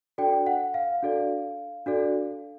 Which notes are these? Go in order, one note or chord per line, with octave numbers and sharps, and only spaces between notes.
D4 F#4 A4 D5 G5
F#5
F5
D4 F#4 A4 D5
D4 F#4 A4 D5